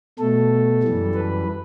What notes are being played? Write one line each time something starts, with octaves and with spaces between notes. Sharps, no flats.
B2 A3 A4
F#2 E3 G3
B4